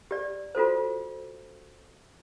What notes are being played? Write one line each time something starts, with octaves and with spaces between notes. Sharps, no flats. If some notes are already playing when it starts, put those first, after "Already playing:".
G4 D5
F4 F#4 A4 C5